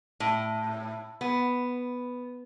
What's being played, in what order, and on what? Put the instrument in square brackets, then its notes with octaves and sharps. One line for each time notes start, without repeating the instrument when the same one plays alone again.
[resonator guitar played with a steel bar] A2
B3